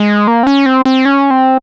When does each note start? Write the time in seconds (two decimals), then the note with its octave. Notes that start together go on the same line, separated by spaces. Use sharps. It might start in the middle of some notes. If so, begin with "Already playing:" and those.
Already playing: G#3
0.27 A#3
0.43 C4
0.47 C#4
0.66 C4
0.85 C4
1.05 C#4
1.31 C4